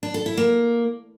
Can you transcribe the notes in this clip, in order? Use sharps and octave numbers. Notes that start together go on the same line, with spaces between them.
D4
A4
E4
A#3